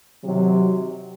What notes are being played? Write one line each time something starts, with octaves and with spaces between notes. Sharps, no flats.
C3 D#3 F#3